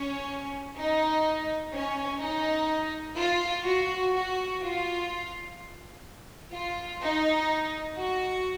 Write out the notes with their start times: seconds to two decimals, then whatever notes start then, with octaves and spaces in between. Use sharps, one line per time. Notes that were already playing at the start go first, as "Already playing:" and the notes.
Already playing: C#4
0.77 D#4
1.73 C#4
2.20 D#4
3.17 F4
3.64 F#4
4.13 F#4
4.62 F4
6.53 F4
7.02 D#4
7.97 F#4